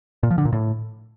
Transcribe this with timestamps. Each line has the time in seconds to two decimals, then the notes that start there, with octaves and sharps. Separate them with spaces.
0.23 A#2
0.31 F3
0.38 D3
0.45 A#2
0.53 A2